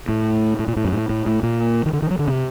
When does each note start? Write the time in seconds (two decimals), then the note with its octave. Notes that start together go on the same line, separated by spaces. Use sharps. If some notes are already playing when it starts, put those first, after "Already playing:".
0.09 A2
0.59 A2
0.68 A#2
0.77 A2
0.84 F#2
0.92 A2
1.09 A2
1.26 A2
1.43 A#2
1.86 D#3
1.93 D3
2.02 D#3
2.10 F#3
2.19 D3
2.27 C3